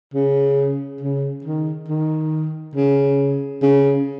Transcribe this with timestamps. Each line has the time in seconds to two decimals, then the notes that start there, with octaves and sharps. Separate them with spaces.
0.14 C#3
1.01 C#3
1.44 D#3
1.88 D#3
2.75 C#3
3.63 C#3